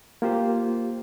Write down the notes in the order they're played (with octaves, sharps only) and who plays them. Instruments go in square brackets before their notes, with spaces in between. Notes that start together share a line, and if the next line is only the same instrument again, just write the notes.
[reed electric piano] A#3 F4 G4 C5